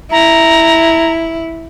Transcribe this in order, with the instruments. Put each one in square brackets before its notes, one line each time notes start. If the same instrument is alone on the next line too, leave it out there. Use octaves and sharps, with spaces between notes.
[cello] E4 [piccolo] A#5